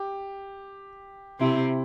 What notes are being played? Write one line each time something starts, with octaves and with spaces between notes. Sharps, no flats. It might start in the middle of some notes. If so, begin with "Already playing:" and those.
Already playing: G4
C3 C4 E4